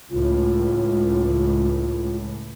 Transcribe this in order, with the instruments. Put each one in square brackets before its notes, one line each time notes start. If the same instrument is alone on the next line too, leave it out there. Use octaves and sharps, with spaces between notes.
[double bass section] C#2 A2 [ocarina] F4